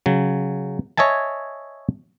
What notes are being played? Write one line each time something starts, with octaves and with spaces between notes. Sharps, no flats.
C#3 F#3
C#5 D#5 E5 G#5 A5